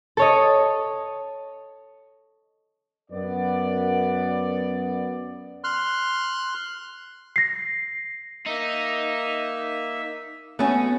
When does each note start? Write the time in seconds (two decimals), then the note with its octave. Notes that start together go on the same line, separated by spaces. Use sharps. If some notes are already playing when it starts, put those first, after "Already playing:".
0.17 A4 C#5 D#5
3.11 F#2 B3 D5
5.64 C6 F6 F#6
7.36 A#6 C7
8.46 A#3 D#4 E5
10.59 A3 B3 C#4 F#4